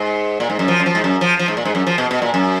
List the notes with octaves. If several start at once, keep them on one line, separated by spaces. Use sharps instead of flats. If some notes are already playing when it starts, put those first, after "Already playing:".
Already playing: G#2
A#2
G#2
F#2
F3
F#2
F3
G#2
F#2
F3
F3
G#2
A#2
G#2
F#2
F3
B2
B2
A#2
F#2